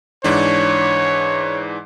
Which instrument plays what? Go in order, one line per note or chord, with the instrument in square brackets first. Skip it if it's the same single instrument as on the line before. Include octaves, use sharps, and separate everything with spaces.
[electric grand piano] G#2 E3 D4 [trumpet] C#5